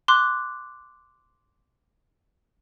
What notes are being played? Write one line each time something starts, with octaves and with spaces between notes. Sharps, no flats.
C6 D6 F#6